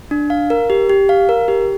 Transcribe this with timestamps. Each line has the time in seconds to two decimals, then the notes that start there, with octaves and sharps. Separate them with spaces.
0.11 D4
0.30 F5
0.50 A#4
0.70 G4
0.89 G4
1.09 F5
1.29 A#4
1.48 G4